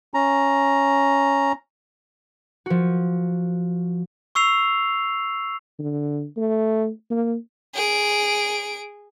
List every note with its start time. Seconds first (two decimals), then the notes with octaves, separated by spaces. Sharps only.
0.14 C#4 A#5
2.66 F3 F#4
4.35 C#6 E6 C7 F7
5.79 D3
6.37 A3
7.11 A#3
7.75 G#4 D7